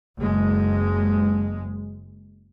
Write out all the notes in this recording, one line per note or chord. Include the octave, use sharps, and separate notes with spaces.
F#1 G#3